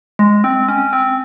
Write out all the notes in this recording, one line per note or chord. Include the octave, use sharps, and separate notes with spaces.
G#3
C4
C#4
C4